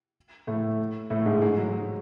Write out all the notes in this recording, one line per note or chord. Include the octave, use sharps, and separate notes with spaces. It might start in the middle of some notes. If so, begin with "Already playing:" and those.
A2 A3
A2 A3
G#2 G#3
G#2 G#3
F#3
F#3